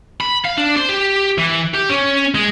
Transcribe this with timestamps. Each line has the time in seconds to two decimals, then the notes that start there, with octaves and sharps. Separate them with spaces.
0.21 B5
0.45 F5
0.58 D4
0.77 C5
0.89 G4
1.38 E3
1.74 G4
1.90 C#4
2.35 G#3